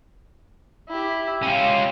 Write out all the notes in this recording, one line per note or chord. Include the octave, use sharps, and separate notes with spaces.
E4 G4
C#4 F4 G5